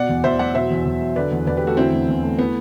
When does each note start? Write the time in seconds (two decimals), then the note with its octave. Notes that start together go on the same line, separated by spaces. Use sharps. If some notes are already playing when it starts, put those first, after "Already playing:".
Already playing: B2 D5 F#5
0.09 E2
0.24 E2 C5 E5
0.39 F#3 D5 F#5
0.55 B2 C5 E5
0.71 E2
0.86 E2
1.01 F#3
1.16 D3 B4 D5
1.32 E2
1.46 E2 B4 D5
1.57 G4 B4
1.62 A3
1.67 F#4 A4
1.77 D3 C4 E4
1.93 E2
2.08 E2
2.23 A3
2.39 E3 B3